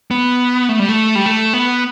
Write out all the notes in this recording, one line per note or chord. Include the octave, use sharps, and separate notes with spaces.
B3
A3
G3
A3
G3
A3
B3